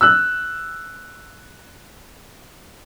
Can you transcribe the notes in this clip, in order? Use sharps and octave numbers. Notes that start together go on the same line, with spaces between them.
E6 F#6